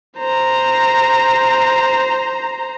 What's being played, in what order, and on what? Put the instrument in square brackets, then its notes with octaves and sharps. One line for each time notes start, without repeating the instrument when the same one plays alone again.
[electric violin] C5 A#5